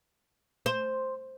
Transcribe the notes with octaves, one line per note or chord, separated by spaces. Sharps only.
C5